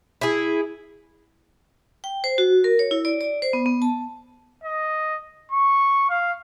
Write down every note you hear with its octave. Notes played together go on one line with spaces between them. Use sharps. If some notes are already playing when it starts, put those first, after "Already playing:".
E4 G#4
G5
C5
F#4
A#4
C#5
E4
D5
D5
C5
B3
B3
A5
D#5
C#6
F5